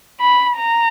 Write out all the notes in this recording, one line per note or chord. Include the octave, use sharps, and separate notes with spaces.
B5
A#5